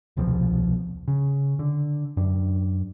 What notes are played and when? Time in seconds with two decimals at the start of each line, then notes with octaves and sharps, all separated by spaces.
0.17 D#1 C2 B2 F3
1.08 C#3
1.59 D3
2.17 F#2 D4